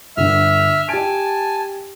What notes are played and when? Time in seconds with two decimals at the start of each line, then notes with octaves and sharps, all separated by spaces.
0.17 G1 D3 E5 F6
0.89 G4 G#5 A5 D7